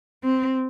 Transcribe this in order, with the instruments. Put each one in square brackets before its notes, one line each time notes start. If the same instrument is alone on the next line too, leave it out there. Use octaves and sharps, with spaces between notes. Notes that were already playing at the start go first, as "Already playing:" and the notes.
[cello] C4